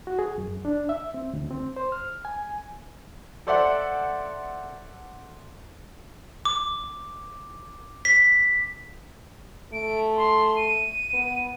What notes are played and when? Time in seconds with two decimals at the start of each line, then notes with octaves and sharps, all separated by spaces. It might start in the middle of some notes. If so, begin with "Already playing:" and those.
0.07 F#4
0.19 G#4
0.38 F#2
0.65 D4
0.89 E5
1.14 C4
1.33 D2
1.51 C4
1.76 C5
1.92 F6
2.25 G#5
3.47 A4 C5 D5 E5 F#5
6.45 D6
8.05 B6
9.73 A3 D7
10.17 C6
10.57 D#7
11.13 B3